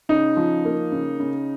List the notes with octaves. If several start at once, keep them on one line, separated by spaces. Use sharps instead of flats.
C#3 D#4
F3
A#3
C#3
C#3